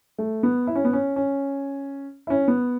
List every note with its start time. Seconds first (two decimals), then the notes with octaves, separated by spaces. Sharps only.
0.18 A3
0.43 B3
0.67 E4
0.75 C#4
0.85 B3
0.93 C#4
1.16 C#4
2.27 E4
2.30 C#4
2.48 B3